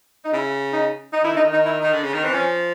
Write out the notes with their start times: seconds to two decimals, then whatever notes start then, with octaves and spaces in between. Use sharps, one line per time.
0.25 D#4
0.33 C#3 E4
0.73 D#4
1.14 D#4
1.23 D#3 E4
1.34 D3
1.37 D#4
1.43 D#3
1.53 D#4
1.66 E4
1.80 D#3 D#4
1.93 D3
2.03 C#3
2.14 D#3
2.24 E3 C4
2.34 F3 C#4